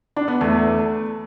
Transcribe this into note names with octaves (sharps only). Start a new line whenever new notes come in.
D4
B3
E2 A3